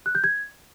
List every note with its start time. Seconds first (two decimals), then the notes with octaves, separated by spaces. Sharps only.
0.06 F#6
0.15 G6
0.24 G#6